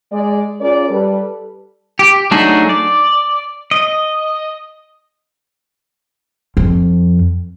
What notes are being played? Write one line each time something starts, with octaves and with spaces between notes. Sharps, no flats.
G#3 D5
C#4 F4 G#4 A#4 D5
G3 A4 B4
G4
F#3 A3 D4 D#4 G#4
D5
D#5
F2